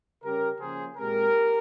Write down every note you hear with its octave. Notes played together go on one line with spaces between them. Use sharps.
C#3 G3 C#4 G4 A#4
C#3 F3 A#3 C#4 G#4 C5
A#2 G#3 C4 G4 A#4